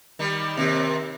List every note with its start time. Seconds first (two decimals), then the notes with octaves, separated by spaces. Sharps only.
0.19 D#3 G3
0.57 D#2 C3